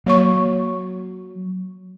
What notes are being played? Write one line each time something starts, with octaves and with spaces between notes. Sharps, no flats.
F#3 A#3 C#5 C#6